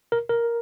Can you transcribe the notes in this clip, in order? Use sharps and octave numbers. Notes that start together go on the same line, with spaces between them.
A#4
A#4